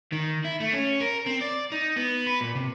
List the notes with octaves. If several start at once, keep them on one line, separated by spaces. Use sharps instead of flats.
D#3
E4
A3
C#4
A#4
C4
D5
D#4
B3
B4
A#2
C3